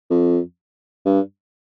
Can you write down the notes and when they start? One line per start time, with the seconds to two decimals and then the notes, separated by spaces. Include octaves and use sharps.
0.10 F2
1.05 G2